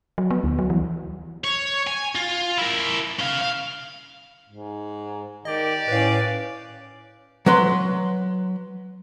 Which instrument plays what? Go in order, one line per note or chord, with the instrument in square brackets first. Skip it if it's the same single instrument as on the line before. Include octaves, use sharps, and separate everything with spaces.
[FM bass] F#3
B3
D2
F#3
E3
[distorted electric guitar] C#5
G#5
F4
E4 A#4
C#4 F5
F5
[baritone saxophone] G#2
[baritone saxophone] D#3 [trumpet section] G4 D5 [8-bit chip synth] D#5
[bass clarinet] A2 [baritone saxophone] C#4 [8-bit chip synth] B4 F5
[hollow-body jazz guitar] F#3 B4 C6